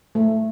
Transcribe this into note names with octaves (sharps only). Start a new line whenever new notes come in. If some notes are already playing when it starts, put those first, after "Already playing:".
A3